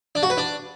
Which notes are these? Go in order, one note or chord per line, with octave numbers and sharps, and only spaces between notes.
D4
F#4
B4
D4